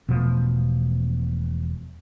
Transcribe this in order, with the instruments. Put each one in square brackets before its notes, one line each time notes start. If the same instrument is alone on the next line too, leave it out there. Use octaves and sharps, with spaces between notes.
[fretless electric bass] E1 B2 F3 A3